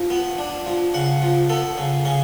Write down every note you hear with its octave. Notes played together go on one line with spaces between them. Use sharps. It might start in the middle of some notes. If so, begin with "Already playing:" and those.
Already playing: F3
B3
D4
F3
C#3 F#5
F3
B3 A4
C#3
C#3 G#4